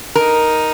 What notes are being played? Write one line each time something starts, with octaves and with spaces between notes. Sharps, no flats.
D#4 A#4